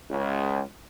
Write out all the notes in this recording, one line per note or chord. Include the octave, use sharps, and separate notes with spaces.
C#2